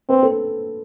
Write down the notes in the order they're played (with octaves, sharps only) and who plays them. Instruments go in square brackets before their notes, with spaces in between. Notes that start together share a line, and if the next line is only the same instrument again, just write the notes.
[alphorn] C4 [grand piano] B4
[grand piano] A4